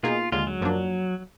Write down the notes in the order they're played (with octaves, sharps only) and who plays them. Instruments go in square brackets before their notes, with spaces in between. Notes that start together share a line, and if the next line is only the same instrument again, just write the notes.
[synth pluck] B2 A#3 D#4 G#4 [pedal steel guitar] F4
[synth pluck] D#2 D3 G#3 [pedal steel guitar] F4
[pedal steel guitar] F#3
[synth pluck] F#2 F3 A#3 D4